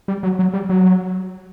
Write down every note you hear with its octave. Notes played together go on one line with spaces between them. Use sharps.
G3
F#3
F#3
G3
F#3